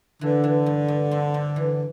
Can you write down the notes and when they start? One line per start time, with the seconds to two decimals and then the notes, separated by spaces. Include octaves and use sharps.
0.21 D3 E3
0.44 E3
0.66 G2
0.88 G2
1.11 C4
1.34 C4
1.56 E3